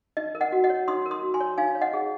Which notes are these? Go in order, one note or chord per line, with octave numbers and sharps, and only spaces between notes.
D#4 D#5
A#4
D#5 F#5
F#4
D#5 F#5
C#5
D#4 C6 D#6
A#4
C6 D#6
F#4
G#5 C6
C#5
D#4 F5 G#5
C#5
D#5 F#5
G#4